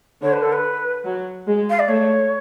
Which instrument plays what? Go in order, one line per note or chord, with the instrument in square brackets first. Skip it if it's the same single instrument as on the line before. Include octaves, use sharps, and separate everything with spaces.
[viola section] D3 [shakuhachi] C#5
[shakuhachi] B4
A4
B4
[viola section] F#3
G#3
[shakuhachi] F5
D5
[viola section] A3 [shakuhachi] C#5